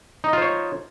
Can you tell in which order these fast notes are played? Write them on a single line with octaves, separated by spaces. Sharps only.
D#4 D#5 F4 C5 C#5